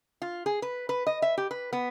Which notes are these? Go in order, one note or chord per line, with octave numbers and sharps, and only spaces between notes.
F4
G#4
B4
B4
D#5
E5
G4
B4
B3